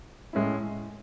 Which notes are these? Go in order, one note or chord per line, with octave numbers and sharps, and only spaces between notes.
A2 G#3 C#4 E4